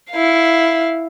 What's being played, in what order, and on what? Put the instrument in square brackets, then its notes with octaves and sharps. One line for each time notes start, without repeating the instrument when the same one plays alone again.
[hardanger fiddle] E4 F5